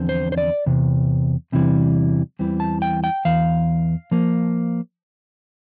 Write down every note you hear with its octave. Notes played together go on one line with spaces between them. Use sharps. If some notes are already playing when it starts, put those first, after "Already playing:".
Already playing: E2 D3 F3 C4
C5
C5
D5
E2 C3
E2 C3 E3 G3
E2 E3 G3 C4
A5
G5
G5
E2 E3 F5
F3 A#3